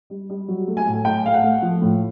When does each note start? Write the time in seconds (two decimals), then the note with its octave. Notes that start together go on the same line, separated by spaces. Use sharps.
0.10 G3
0.30 G3
0.48 F#3
0.68 A3
0.77 G#5
0.86 A2
1.05 A2 G5
1.25 A3 F5
1.34 F#5
1.44 A3
1.62 F3
1.81 A2